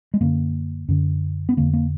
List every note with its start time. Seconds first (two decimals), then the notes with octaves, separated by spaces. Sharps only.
0.14 G#3
0.20 F#2 D3 A#3
0.88 F#2 D3
1.49 B3
1.57 F2 D3 A#3
1.73 A#3